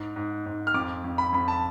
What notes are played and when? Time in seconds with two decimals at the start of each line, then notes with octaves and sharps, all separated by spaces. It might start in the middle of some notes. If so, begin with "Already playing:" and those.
Already playing: G#2
0.16 G#2
0.46 G#2
0.67 F6
0.74 F2 D6
1.04 F2
1.18 B5
1.33 F2 B5
1.48 A5